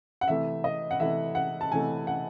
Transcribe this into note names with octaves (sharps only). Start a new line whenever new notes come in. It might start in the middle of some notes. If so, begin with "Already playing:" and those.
F#5
C3 E3 A3 E5
D#5
F#5
C3 E3 A3 E5
F#5
A5
C3 E3 A3 G#5
F#5